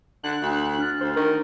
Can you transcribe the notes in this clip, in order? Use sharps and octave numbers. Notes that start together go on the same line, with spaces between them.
D3 F#6
D2
D4 F6 A6
D2 C5
D#3 A#4